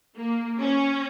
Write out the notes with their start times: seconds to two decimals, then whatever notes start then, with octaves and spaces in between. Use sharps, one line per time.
0.17 A#3
0.60 C#4